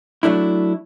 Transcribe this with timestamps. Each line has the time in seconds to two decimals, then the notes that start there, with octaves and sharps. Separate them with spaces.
0.23 F#3 A3 D4 E4